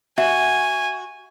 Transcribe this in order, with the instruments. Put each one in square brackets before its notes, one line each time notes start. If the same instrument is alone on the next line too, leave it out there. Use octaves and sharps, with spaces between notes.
[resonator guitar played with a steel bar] F#4 [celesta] E5 [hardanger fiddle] G#5